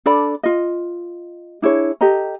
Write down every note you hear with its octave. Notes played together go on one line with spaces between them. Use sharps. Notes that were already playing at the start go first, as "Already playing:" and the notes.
D4 A4 D5 B5
F4 D#5
D4 E4 G#4 C#5
G4 A4 D#5 A#5